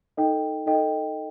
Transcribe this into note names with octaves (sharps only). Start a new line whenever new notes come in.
D#4 A4 D#5 G5
D#4 A4 D#5 G5